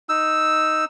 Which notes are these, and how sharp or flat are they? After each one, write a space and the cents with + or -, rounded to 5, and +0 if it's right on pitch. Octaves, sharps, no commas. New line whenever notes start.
D#4 +0 E6 +0